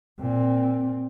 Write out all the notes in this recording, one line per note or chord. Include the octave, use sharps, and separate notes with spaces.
A#2 C4